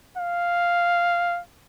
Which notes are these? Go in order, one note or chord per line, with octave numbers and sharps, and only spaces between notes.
F5